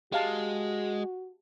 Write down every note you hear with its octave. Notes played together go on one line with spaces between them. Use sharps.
G#3 F#4 G4 F5 A5